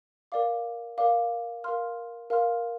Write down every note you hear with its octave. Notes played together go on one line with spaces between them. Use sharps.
A#4 D5 F5 D6
A#4 D5 F5 D6
A#4 F5 C6 F6
A#4 F5 C6 F6